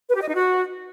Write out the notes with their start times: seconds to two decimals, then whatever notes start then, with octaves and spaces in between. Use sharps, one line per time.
0.09 B4
0.16 G4
0.22 D#5
0.29 D#4
0.35 F#4